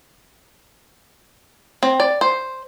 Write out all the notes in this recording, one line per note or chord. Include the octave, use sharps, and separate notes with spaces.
C4
D5
C5